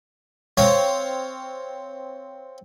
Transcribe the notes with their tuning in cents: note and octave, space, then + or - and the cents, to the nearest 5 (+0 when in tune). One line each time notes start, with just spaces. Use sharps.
C4 +0 C#5 +0 F5 +0